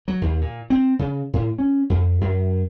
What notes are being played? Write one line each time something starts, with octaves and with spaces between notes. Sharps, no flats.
F#3
D#2
A#2
C4
C#3
A2
C#4
F2
F#2